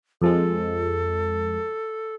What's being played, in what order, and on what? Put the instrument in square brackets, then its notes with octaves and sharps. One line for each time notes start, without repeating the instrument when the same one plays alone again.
[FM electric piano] F2 F3 G#3 [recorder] A4